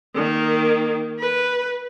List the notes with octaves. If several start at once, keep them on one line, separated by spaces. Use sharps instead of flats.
D#3 A#3
B4